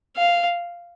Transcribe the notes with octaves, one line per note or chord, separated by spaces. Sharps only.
F5